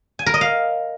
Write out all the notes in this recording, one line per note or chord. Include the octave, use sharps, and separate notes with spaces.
G#5
A#4
D#5
F5